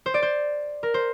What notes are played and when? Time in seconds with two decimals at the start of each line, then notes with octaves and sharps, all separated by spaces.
0.06 C5
0.14 D5
0.22 C5
0.83 A#4
0.94 C5